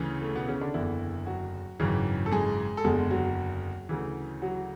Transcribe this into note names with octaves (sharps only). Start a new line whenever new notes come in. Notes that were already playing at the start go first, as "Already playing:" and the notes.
Already playing: D2 C#3 E3
A3
B2 B3
C#3 C#4
D3 D4
F#1 E2 D3 E3 E4
F#3 F#4
G#1 F#2 C#3 E3
A4
G#3 G#4
A4
F#1 E2 D3 G#3 G#4
F#3 F#4
D2 C#3 E3
F#3 F#4